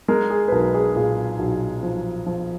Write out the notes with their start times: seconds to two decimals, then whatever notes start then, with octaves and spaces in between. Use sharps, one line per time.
0.08 G#3 A#4
0.30 G#4
0.48 B4
0.52 B1 A#4
0.75 G#4
0.96 A#2 G#4
1.39 B1
1.83 F3
2.26 F3